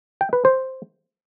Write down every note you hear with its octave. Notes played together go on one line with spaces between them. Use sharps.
G5
B4
C5